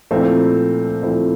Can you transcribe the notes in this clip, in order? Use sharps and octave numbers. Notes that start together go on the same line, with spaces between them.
A#2 F3 A3 C4 E4
A#2 F3 A3 C4 E4